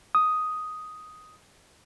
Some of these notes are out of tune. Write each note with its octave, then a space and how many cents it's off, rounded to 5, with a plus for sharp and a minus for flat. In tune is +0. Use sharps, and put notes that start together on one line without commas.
D#6 +5